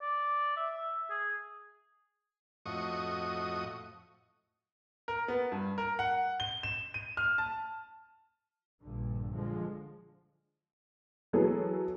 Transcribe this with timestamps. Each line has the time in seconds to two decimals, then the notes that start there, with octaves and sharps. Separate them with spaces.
0.02 D5
0.57 E5
1.10 G#4
2.66 F2 A2 F#4 D#5 C#6 D#6
5.08 A#4
5.28 B3
5.52 G2
5.78 A#4
5.99 F#5
6.40 G7
6.63 E7
6.94 D#7
7.17 F6
7.38 A5
8.82 A#1 G2 D3
9.33 D3 F3 G#3
11.33 E3 F#3 B3 G#4 A4